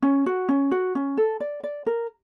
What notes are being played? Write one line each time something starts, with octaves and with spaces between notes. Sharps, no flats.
C#4
F#4
C#4
F#4
C#4
A4
D5
D5
A#4